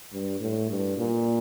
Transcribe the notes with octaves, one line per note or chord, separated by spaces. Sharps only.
G2
A2
G2
A#2